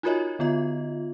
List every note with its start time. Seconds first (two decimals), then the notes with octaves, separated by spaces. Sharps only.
0.03 D#4 F4 F#4 A#4 C#5 D#5
0.39 D3 B3 F4 D#5